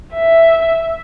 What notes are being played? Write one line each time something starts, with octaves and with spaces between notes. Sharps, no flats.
E5